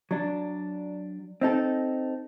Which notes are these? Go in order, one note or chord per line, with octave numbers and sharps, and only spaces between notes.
F#3 D4
C4 D#4 A4